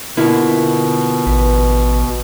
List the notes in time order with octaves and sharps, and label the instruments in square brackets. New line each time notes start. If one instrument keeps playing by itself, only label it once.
[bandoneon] B2 [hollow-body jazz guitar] D3 A#3 E4 [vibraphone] F4
[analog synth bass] A1 [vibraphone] B4